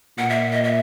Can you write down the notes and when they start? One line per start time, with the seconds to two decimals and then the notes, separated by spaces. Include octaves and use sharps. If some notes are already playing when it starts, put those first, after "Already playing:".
0.18 A#2 F#5
0.30 E5
0.52 D#5
0.64 E5